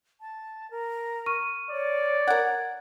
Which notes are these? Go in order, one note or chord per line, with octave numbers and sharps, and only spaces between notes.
A5
A#4
C#6 F6 D#7
C#5 D5
A#4 F#5 G#6